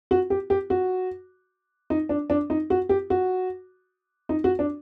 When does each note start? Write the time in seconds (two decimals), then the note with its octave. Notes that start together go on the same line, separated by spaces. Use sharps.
0.11 F#4
0.30 G4
0.50 G4
0.70 F#4
1.90 D#4
2.09 D4
2.30 D4
2.50 D#4
2.70 F#4
2.89 G4
3.10 F#4
4.29 D#4
4.44 F#4
4.59 D4